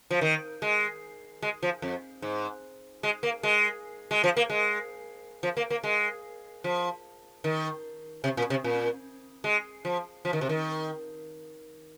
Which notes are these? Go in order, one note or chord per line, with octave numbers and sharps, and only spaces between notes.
F3
D#3
G#3
G#3
F3
F2
G#2
G#3
A#3
G#3
G#3
F3
A#3
G#3
F3
A#3
A#3
G#3
F3
D#3
C3
A#2
C3
A#2
G#3
F3
F3
D#3
C3
D#3